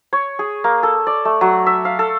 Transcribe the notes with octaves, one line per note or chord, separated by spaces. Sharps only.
C#5
G#4
A#3
A4
D5
A3
F#3
E5
F5
A4